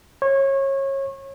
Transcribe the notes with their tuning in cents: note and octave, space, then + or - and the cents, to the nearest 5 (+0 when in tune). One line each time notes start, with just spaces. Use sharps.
C#5 -25